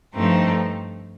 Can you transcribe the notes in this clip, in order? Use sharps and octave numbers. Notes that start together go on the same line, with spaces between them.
G2 F3 A3 C4 D#4